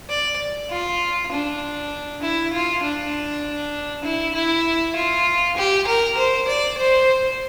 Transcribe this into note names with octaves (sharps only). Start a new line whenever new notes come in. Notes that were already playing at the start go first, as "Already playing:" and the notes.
D5
F4
D4
E4
F4
D4
E4
E4
F4
G4
A#4
C5
D5
C5